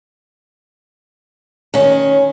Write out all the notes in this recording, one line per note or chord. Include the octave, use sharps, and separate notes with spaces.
D#3 C#4